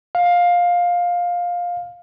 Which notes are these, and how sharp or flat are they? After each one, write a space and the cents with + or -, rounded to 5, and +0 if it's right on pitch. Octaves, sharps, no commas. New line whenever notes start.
F5 +15